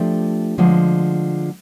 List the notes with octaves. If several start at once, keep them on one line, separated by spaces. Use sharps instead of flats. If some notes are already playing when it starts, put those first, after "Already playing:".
Already playing: F3 A3 D4 G4
D3 F3 G#3